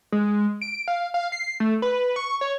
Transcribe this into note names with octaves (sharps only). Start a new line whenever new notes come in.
G#3
D7
F5
F5
C7
A3
B4
C#6
C#5